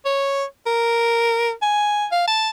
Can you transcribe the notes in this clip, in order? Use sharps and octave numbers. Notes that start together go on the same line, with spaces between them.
C#5
A#4
G#5
F5
A5